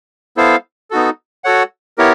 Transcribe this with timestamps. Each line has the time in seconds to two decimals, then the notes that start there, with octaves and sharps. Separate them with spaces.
0.37 B3 E4 A4 C5 F5
0.91 B3 D#4 F#4 A4
1.44 F#4 A4 C#5 F#5
1.98 B3 E4 G4 A#4 C#5